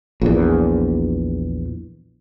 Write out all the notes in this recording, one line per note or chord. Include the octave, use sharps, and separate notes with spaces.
A#1 E2